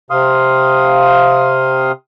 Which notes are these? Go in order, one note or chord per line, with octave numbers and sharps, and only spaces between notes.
C3 F5 C6 D#6